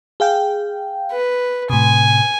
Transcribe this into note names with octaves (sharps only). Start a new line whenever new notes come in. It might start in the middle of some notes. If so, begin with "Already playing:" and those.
G#4 F5 G5
B4
A2 C3 G#5